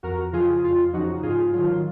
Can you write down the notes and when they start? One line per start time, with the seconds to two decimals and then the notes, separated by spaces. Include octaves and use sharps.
0.03 F2 F#4 A#4
0.33 C#3 F3 F4 G#4
0.63 F2 F4
0.93 C#3 F3 D#4 F#4
1.23 G#2 F4 G#4
1.53 F#3 F4
1.58 D#3